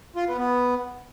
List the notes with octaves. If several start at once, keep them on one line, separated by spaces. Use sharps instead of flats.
F4
B3
B3